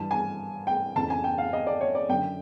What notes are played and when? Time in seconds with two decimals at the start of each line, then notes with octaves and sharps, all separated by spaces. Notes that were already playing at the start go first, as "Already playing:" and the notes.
Already playing: G2 E3 A5
0.11 G#5
0.67 G5
0.95 F2 C#3 E3 A5
1.10 G#5
1.24 G5
1.38 F5
1.53 D#5
1.67 D5
1.81 C#5
1.95 D5
2.09 F#2 D3 G5